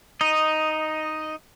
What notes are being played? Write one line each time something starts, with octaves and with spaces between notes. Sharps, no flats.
D#4 D#5